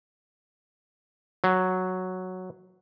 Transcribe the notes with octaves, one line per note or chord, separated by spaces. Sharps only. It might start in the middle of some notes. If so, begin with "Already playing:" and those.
F#3